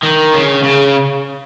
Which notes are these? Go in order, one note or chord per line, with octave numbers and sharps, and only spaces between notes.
D#3
C#3
C#3